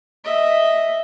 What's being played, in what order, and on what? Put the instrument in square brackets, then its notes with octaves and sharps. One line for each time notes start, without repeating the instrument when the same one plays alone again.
[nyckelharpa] D#5 E5